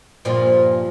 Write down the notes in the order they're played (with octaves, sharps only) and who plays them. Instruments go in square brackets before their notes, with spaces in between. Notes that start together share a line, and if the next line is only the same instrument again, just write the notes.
[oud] G2 A#2 F3